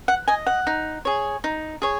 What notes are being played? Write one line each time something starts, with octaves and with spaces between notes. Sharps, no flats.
F#5
D#5 G#5
F#5
D#4
G#4 C#5
D#4
G#4 C#5